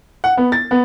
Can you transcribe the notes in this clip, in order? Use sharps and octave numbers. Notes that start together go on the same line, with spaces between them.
F#5
B3
A6
B3